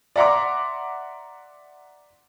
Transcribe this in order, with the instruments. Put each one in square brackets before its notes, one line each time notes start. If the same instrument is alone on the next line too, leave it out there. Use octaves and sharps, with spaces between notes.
[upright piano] D5 E5 F#5 A#5 C6 D6